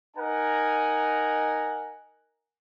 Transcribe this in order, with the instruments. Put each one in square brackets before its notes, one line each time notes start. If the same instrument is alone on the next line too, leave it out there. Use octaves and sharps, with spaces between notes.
[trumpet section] D#4 A#4 F#5 G#5 A#5